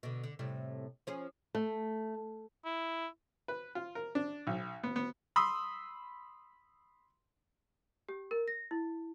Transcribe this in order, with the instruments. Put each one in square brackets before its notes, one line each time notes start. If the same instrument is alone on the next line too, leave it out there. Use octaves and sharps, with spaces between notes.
[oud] B2 D3
D3
A2 C3 G3
F3 C#4 G#4
[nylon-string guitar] A3
[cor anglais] E4
[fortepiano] B4
F4
A#4
D4
B1
B3
B3
B5 C6 D#6 E6
[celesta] G4
A#4
A#6
E4